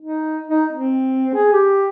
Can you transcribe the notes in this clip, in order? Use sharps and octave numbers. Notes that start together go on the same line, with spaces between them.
D#4
D#4
C4
G#4
G4